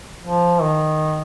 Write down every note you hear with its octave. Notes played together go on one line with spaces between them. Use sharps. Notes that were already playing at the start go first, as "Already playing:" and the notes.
F3
D#3